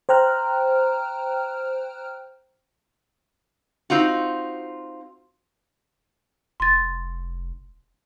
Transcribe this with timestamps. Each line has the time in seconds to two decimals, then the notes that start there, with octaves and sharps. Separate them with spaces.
0.09 C5 G5 A#5 F6 F#6
3.90 C4 D#4 F4 F#4
6.60 F1 C6 A6